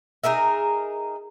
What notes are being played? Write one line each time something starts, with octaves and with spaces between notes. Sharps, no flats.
D#4 G#4 A#4 E5